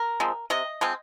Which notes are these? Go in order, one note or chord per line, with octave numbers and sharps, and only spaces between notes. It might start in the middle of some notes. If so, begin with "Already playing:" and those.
Already playing: A#4
F3 G#3 C4
C3 D#5
F3 G#3 C4